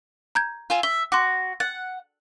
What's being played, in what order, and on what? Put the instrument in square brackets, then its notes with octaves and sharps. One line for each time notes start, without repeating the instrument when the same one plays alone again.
[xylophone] A#5 G6 G#6
[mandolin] F4 E5 G#5
[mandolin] E5 [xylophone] G7
[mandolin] F#4 [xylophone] C6 D6
[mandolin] F#5 [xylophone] A6